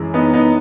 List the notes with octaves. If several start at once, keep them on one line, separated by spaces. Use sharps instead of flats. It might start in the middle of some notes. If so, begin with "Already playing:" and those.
Already playing: F#2 E3 G#3
B3 D#4
B3 D#4